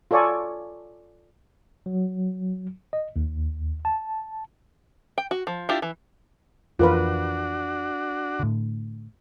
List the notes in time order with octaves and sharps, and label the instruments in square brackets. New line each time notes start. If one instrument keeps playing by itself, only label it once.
[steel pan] F4 A4 C#5 D5 G#5 C#6
[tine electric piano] F#3
D#5
D#2
A5
[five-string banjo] G5
F#4
F3
D4 E4 F4 G4
E3
[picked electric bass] F2 E3 [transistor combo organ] D4 F#4 [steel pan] F4 A#4 B4
[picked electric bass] A2 D3